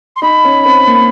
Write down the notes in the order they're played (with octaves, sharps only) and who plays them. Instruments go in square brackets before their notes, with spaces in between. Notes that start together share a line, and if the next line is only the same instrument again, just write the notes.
[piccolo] C6
[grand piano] D#4 [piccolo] B5
[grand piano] C#4
C4
A#3